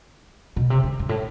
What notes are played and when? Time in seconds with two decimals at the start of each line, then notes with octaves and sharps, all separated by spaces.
0.56 B2
0.70 C3
0.84 D3
0.99 G2
1.09 A2